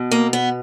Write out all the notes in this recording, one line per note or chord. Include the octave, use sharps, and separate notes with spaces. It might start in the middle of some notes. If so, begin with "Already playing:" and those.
Already playing: B2
A#3
B3